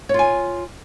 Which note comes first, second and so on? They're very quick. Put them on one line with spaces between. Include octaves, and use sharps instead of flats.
C#5 F4 G#5